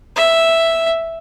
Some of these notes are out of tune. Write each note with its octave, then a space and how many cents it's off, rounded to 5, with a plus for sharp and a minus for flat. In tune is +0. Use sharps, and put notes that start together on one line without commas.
E5 +0